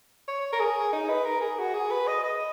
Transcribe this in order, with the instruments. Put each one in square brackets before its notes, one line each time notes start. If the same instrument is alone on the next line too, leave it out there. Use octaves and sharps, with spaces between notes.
[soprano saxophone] C#5
A#4
G#4
D#4
B4
A#4
G#4
F#4
G#4
B4
D#5
D#5